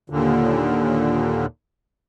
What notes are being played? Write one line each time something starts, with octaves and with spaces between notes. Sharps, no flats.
D#2 A#2 D3